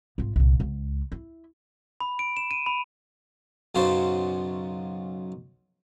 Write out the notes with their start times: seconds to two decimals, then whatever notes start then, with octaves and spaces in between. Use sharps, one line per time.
0.18 G#1 F4
0.36 C2 A#2
0.60 C#2
1.12 E4
2.00 B5
2.19 D7
2.37 E7
2.51 D#7
2.66 B5
3.75 B1 F#2 C#3 C5 A5